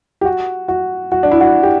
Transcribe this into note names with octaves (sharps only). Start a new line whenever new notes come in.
G4
F#4
F#4
F#4
D4
E4
F#4
G4